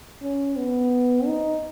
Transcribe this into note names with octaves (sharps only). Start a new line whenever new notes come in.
C#4
B3
D#4